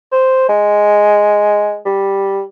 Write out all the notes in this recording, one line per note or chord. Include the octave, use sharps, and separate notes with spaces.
C5
G#3
G3